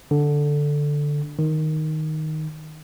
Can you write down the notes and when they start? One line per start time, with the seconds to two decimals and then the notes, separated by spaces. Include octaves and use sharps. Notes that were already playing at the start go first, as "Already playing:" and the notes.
0.11 D3
1.39 D#3